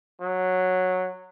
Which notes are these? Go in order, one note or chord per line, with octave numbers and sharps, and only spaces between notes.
F#3